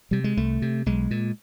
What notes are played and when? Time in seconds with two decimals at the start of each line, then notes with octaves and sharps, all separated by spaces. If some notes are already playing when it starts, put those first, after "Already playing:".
0.11 C3 G3
0.24 G#3
0.37 C2 A3
0.62 C3
0.86 B1 G#3
1.11 A#2